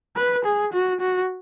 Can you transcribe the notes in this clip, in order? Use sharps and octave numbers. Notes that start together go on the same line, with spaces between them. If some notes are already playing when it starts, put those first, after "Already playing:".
B4
G#4
F#4
F#4